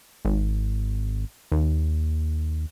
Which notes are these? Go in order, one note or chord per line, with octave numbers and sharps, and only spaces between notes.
G#1
D#2